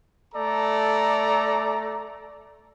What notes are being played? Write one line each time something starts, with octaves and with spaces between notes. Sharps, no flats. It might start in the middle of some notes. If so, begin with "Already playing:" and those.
A3 A4 D5 A#5